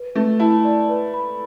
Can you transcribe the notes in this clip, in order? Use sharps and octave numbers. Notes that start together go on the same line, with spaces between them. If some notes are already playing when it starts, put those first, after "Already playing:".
Already playing: B4
A3 B4
E4 A5
D5
B4
B5